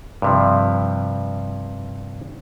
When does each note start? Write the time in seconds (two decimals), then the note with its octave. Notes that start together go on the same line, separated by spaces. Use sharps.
0.22 G2 C3 F3